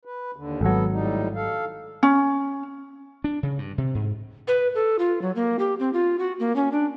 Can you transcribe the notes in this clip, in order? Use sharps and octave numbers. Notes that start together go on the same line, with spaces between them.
B4
D#2 D3
G#1 F#3 B3 A4
A2 G3 D#4
A4 F5
C#4
D4
C#3
G2
C3
G#2
B4
A4
F4
F#3
A#3
G4
C4
F4
F#4
A#3
C#4
D4